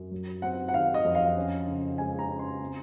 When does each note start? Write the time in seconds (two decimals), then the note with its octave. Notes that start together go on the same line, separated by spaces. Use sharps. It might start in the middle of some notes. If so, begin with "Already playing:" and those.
Already playing: F#2
0.11 F#3
0.42 C4 F#5
0.68 F#5
0.73 D#3 F5
0.94 D#5
1.04 F2
1.15 F5
1.37 C#4
1.67 C#3
1.98 G#3 G#5
2.19 A#5
2.29 C#3
2.39 C6
2.61 C4